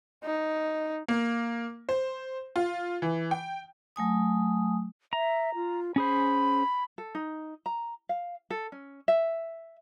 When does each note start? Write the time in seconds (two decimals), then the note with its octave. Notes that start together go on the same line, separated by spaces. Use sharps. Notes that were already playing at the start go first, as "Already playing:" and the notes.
0.24 D#4
1.08 A#3
1.89 C5
2.56 F4
3.02 E3
3.31 G5
3.96 F#3 A3 G#5 D#6
5.13 E5 A#5
5.55 F4
5.96 C#4 G#4 C5 B5
6.98 A4
7.15 D#4
7.66 A#5
8.09 F5
8.50 A4
8.72 C#4
9.08 E5